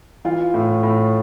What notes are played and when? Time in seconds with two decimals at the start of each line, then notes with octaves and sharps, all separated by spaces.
0.25 E3 F4
0.54 A2
0.83 A2